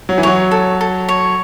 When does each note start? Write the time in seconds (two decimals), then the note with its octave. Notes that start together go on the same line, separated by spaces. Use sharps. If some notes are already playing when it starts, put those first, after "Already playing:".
0.09 F#3
0.18 E3
0.23 F#3 C#5
0.51 A4
0.81 A4
1.09 C#5